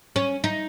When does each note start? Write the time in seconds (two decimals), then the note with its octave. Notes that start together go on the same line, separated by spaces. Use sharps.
0.16 C#4
0.44 D#4